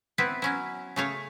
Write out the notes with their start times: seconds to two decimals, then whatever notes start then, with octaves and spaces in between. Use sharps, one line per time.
0.18 B3 C4 E4 B4
0.42 F#3 C#4 E4
0.96 C#3 A3 C#5 F5